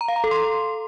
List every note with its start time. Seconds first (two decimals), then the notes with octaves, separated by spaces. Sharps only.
0.01 A#5
0.08 F5
0.16 A#5
0.24 A4
0.31 C6